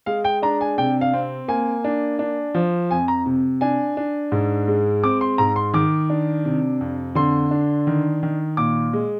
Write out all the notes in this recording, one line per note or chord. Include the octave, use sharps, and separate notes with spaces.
G#3 F5
G5
D4 A#5
G#5
C3 G5
F5
C4
A#3 G#5
D4
D4
F3
F2 G#5
A#5
C3
D4 G#5
D4
G#2
G#3
C4 D6
C6
G#2 A#5
C6
D#3 D6
D4
C3
F2
D3 C6
D4
D#3
D#3
A#2 D6
G#3